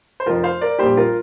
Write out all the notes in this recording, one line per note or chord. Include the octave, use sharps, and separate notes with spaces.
C5
F1 F2 F3 F4 A#4
C5 F5
A#4 D5
A#1 A#2 G3 G4 C5
F4 A#4